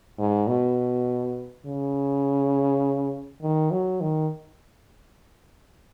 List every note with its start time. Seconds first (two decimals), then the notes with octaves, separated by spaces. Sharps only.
0.18 G#2
0.48 B2
1.65 C#3
3.42 D#3
3.71 F#3
4.01 D#3